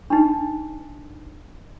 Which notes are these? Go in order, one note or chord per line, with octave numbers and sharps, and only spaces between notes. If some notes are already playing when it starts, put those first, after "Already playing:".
D4 D#4